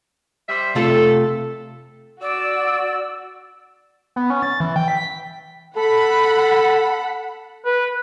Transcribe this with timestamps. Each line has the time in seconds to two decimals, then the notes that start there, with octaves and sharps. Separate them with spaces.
0.49 G3 C5 E5
0.75 C3 A3 F4 A4
2.22 F#4 D5 E6
4.16 B3
4.30 C#4
4.42 A6
4.60 E3
4.76 G5
4.88 B6
5.77 A4 F#5 B5
7.66 B4